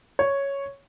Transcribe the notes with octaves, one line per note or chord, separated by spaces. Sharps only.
C#5